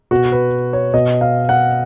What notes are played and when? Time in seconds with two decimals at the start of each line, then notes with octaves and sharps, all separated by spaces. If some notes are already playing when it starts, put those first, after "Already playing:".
0.11 B2 F#4
0.32 B4
0.73 C#5
0.94 B2 D#5
1.21 F5
1.49 F#5